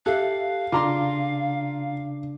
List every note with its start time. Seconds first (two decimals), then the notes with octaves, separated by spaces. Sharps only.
0.06 G4 A4 E5 F5 F#6
0.72 C#3 D4 F4 A#5 C6 D6